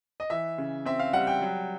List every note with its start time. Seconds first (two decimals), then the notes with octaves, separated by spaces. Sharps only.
0.20 D#5
0.30 E3 E5
0.58 C#3
0.86 C4 E5
0.99 F5
1.13 G3 F#5
1.27 G5
1.41 F#3